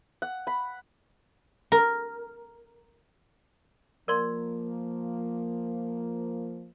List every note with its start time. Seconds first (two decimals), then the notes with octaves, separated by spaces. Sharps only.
0.22 F#5
0.47 B5
1.72 A#4
4.08 F3 A#3 A#4 D5 C6